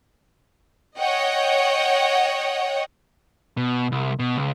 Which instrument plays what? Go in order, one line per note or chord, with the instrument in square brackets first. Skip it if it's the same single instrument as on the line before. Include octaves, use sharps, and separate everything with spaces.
[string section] C#5 D#5 F#5 G5
[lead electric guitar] B2
C2
B2
C#2